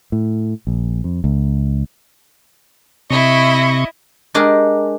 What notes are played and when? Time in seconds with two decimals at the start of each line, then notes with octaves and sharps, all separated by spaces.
0.12 A2
0.67 A#1
1.04 F2
1.24 C#2
3.11 C3 E4 D#5 C#6
4.34 G#3 D4 G4 G#4 A#4